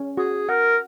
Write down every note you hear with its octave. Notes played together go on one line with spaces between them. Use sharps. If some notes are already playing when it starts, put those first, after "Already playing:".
Already playing: C#4
F#4 G#4
A#4 F#5